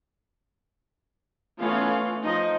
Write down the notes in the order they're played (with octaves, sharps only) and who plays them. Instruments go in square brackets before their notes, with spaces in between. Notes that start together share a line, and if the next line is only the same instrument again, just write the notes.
[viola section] E3 A3 B3 C#4 F4 F5
F3 D#4 D#5